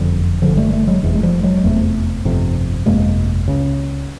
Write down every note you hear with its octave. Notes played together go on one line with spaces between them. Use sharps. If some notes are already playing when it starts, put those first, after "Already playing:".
Already playing: F#1 F2 D3 F3 G3
F#1 F2 D3 F3 G3
G3 A3
G3 A3
F#3 G#3
F1 E2 C3
G#3
F3 G3
F#3 G#3
F1 E2 C3 G3 A3
G1 F2 C3
G1 F2 C3 G#3 A#3
C#2 C#3